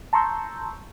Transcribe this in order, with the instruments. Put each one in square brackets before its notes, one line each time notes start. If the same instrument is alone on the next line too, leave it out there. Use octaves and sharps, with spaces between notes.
[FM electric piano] A5 A#5 C6 C#6 E6 G6